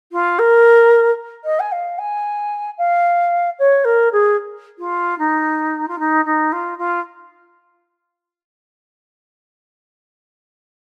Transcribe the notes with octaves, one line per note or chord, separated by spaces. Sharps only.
F4
A#4
D#5
G#5
F5
G#5
F5
C#5
A#4
G#4
F4
D#4
F4
D#4
D#4
F4
F4